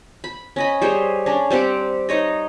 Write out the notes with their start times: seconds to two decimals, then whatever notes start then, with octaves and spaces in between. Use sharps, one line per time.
0.24 B5
0.56 C#4 D#5 B5
0.82 G3 G#4 C5 C#5
1.26 C#4 D4
1.50 G3 C4 G4 F#5
2.09 D#4 C#5 D#5